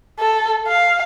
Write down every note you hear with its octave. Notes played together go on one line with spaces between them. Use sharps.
A4
F5